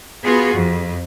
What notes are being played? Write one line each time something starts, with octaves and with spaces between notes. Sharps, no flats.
B3 F4 F#4 G#4
F2